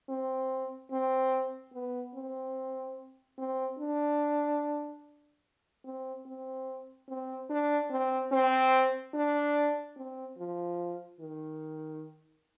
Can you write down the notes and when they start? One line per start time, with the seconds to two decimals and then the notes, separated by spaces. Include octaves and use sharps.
0.09 C4
0.92 C4
1.74 B3
2.15 C4
3.38 C4
3.79 D4
5.85 C4
6.26 C4
7.09 C4
7.50 D4
7.91 C4
8.32 C4
9.14 D4
9.96 C4
10.38 F3
11.20 D#3